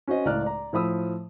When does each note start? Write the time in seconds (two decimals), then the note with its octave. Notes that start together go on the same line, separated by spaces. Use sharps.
0.08 C#4 F#4 C5 D#5
0.25 C#2 A2 D5 A#5 F6 F#6
0.44 D5 A#5
0.73 A2 F3 B5 D#6 E6